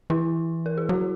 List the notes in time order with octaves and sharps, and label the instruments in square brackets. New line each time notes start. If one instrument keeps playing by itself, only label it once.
[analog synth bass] E3 [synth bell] E4
[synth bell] A#4
G#4
[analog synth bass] F#3 [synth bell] F#4